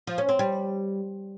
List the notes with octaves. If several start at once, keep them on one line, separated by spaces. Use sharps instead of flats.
F3
C#4
C4
G3